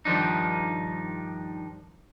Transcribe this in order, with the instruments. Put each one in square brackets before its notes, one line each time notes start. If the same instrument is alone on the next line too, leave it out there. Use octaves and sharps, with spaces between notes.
[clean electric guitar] G2 D#3 F3 D4 D#4